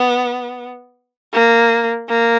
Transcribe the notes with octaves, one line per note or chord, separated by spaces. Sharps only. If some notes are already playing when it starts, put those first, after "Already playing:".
Already playing: B3
A#3
A#3